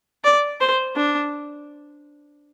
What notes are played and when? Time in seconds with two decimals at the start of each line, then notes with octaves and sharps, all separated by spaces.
0.24 D5
0.61 C5
0.96 D4